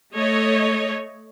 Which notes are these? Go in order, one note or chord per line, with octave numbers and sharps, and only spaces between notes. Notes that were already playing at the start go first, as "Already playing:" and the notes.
A3 C#5 D#5